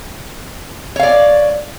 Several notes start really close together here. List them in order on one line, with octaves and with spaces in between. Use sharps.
C#5 F5 D5